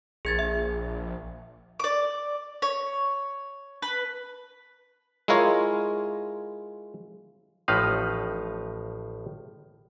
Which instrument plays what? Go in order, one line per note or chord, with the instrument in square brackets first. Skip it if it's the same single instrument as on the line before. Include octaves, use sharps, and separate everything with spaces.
[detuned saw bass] A#1 [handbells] G#4 G#6 A6
[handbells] E5
[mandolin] D5 D6
C#5
B4
[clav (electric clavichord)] G#3 E4 F4 A#4 C#5
A1 A2 F3 D#4 B4 F5